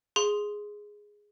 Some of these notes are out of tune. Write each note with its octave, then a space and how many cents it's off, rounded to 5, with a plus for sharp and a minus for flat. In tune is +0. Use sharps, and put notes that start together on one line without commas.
G#4 +0 C6 +0